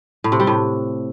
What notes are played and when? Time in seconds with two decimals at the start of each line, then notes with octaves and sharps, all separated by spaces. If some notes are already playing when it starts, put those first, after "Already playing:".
0.24 A2
0.32 C3
0.40 G3
0.47 A2